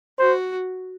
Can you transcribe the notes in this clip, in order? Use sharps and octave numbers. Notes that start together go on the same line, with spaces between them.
F#4 C5